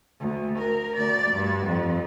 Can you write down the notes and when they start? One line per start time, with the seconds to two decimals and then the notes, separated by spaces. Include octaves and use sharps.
0.21 D2
0.59 A#4
0.96 D2 D5
1.30 G2
1.67 F2